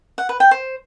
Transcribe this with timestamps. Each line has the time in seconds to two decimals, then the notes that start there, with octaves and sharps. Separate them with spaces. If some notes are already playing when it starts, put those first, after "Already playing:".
0.18 F#5
0.29 B4
0.40 G5
0.51 C5